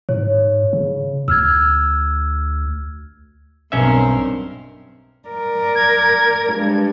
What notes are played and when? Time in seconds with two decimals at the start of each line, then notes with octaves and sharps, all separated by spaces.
0.09 G#2 C#5
0.73 C#3
1.28 D2 E6 F6 G#6
3.72 B1 G2 C4 C#4 A#4 E5
5.29 A#4 D5
5.75 G#6
6.54 G2 G#3